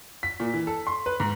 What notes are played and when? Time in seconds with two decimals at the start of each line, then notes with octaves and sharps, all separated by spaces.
0.23 B6
0.40 A#2
0.54 E3
0.67 A4
0.87 C6
1.06 B4
1.20 G#2